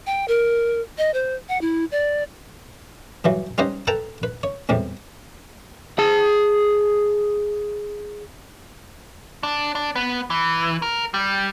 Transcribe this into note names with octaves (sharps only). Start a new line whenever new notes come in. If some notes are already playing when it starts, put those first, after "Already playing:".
G5
A#4
D#5
C5
F#5
E4
D5
G2 E3 F#3
G3 C#4 D#4 B4 C5 D#5
A4 B4 G5 A5 A#5
B4
C#5
E2 A2 C3 G3
G#4 A5
D4
D4
B3
E3
A#4
G3